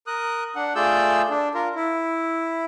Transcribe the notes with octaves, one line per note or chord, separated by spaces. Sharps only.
A#4 D#6 F#6
D4 F#5
A3 F4 G#4 D5 E6 G6
D4
F4 A#4
E4